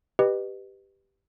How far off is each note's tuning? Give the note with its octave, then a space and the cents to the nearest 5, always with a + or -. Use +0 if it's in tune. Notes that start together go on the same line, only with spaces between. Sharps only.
G4 +0 B4 +0 D#5 -30